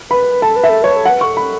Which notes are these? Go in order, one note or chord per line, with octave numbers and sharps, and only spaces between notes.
B4 B5
A4 A5
B4
E5
A4
B4 C#5
A4
B4 F#5
A4 C#6
B5